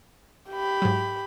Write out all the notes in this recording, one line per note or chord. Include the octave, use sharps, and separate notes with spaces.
G4 B5
G#2 F#3